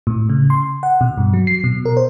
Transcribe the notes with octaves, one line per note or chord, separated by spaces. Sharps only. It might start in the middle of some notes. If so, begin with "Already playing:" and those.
A2
C#3
C6
F#5
B2
G2
F#3
C7
B2
A#4
C5